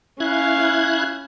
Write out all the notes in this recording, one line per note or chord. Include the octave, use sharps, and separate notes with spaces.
C#4 E4 F5 F#6 G#6